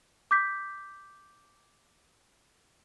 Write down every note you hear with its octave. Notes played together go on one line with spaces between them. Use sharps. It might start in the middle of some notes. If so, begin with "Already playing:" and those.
D6 G6 B6